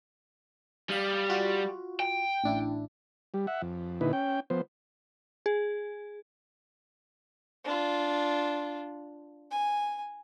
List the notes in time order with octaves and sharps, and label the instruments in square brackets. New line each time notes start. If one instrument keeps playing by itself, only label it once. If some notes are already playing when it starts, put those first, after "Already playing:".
[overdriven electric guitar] G3 [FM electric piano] F5 D#6
[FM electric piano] F4 F#4
[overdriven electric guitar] G5
[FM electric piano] A1 D4 E4
[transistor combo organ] G3
E5 F#5
F2
A#2 D3 D#4 E4 B4
C#4 G5
F3 B3 C5
[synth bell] G#4
[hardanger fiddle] D4 F4
G#5